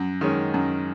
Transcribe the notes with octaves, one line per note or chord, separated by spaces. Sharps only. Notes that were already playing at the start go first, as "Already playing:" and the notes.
Already playing: F#2
D#3 G#3 C#4
F#2